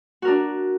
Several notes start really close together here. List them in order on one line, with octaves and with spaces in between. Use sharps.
F#4 A#4 D4